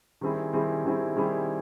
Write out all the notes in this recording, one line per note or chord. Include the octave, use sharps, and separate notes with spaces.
D#3 G3 C4 E4 G#4
D#3 G3 C4 E4 G#4
D#3 G3 C4 E4 G#4
D#3 G3 C4 E4 G#4